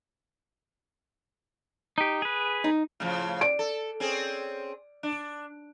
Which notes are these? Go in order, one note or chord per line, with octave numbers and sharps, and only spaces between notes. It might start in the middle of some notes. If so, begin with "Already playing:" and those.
D#4 G4
G#4 B4
D#4
A2 C#3 F3
D5 D7
A4
C4 C#4 G#4
D4